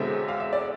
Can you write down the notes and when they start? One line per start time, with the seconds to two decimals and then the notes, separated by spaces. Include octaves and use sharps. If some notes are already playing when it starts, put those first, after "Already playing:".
Already playing: E1 E2 D3 G#3 C4 E5
0.28 F5
0.40 E5
0.53 D5